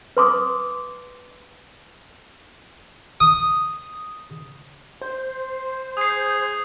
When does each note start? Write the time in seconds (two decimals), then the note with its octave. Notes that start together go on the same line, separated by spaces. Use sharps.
0.17 B4 C6 D6 D#6
3.20 D#6
5.01 C5
5.97 G#4 D#6 C7